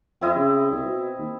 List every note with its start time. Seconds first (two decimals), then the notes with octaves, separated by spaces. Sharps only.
0.21 F2 C4 E4 D#5
0.36 C#3
0.71 C2
0.85 B2
1.19 D#2